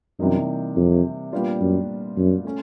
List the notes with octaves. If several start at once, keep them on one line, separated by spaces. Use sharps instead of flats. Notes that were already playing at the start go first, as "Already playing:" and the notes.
F#2 C3 E3 G3 A#3 D#4
F2
A#2 G3 B3 D4 F4
F#2
F#2
A3 C#4